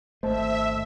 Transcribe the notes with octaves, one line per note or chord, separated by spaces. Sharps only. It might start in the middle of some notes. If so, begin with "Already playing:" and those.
G#1 A3 C5 D#5 E5 A5